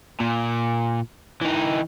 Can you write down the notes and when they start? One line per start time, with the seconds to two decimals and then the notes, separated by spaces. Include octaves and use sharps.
0.20 A#2
1.41 E3 D#4